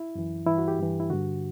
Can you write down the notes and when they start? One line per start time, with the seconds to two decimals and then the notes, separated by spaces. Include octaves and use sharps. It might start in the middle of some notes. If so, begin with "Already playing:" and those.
Already playing: E4
0.15 F#2 E3
0.47 G2 E3 E4
0.58 F#4
0.68 G4
0.79 G2 E3
1.00 E4
1.10 G2 D3 F#4